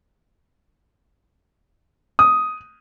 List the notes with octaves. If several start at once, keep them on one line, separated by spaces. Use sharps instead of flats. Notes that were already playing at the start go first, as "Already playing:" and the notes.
D#6